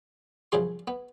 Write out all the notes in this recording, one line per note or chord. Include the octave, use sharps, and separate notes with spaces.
C2 F#2 C#3 F3 G#4 C6
B3